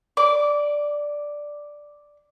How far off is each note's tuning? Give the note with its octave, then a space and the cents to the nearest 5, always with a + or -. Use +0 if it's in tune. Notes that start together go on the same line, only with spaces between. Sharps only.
D5 +0 D6 -15